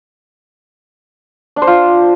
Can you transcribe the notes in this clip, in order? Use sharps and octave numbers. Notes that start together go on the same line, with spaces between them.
D4
C5
F4